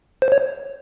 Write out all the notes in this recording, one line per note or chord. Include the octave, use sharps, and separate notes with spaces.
C5
C#5